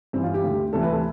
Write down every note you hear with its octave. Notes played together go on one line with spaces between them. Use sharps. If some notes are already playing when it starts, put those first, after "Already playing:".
G2 E3 C4
F4
G4
D2 D3
D2 C3 E3 A4
B4
A4